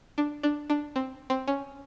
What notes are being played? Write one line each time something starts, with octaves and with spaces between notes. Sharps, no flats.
D4
D4
D4
C4
C4
C#4